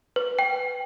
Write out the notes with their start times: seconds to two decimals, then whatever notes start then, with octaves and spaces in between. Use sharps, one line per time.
0.16 B4
0.39 G5